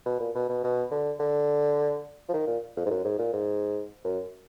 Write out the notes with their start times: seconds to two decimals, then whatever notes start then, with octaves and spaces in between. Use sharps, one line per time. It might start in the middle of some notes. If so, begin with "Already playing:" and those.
0.06 B2
0.20 A#2
0.35 B2
0.49 B2
0.64 B2
0.91 D3
1.19 D3
2.29 F3
2.33 D#3
2.47 A#2
2.77 F2
2.86 G#2
2.90 F#2
3.05 G#2
3.18 A#2
3.33 G#2
4.04 F#2